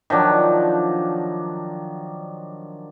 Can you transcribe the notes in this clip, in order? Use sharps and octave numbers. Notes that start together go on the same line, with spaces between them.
D#3 F3 F#3 D4